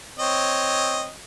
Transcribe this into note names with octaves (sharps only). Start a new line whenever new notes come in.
C4 C#5 D#5